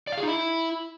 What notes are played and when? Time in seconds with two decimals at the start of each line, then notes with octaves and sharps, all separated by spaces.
0.07 D5
0.12 F5
0.18 G#4
0.23 D#4
0.28 E4